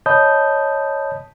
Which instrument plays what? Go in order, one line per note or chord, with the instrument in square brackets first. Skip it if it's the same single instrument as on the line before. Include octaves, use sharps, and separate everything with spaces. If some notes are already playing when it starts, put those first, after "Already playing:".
[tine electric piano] C#5 D#5 A5 B5 D#6 G6